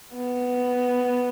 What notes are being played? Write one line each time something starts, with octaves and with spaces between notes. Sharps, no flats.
B3